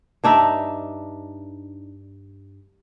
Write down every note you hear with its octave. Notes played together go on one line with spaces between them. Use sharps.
G2 D4 D#4 E5